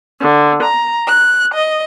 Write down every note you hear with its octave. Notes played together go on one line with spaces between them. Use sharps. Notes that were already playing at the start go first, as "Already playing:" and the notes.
D3
A#5
F#6
D#5